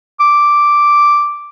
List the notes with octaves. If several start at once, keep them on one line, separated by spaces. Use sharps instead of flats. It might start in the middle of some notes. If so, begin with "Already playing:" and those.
D6